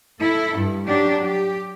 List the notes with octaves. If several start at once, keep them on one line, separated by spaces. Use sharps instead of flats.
E4 A4
G2
F#3 D4 G4
G4